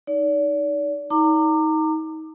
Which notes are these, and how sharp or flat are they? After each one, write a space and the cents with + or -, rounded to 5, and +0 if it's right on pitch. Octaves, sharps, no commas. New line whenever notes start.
D#4 +0 D5 -40
D#4 +30 A#5 -30 D6 +20